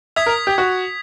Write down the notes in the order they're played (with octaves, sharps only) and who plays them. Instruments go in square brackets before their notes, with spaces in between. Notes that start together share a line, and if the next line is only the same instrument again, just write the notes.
[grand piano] E5 [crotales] D#6 G#6 B6
[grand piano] A#4
G4
F#4